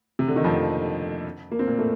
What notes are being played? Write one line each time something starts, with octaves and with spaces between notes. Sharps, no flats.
C3
D3
D#3
F2 F3
A#3
C4
A#2 A#3
A2 A3